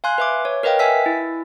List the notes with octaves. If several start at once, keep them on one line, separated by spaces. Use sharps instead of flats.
F5 G#5 C6 F#6
B4 E5 D6
C#5
A#4 B4 D#5 F5 G5
E5 G#5 E6 B6
E4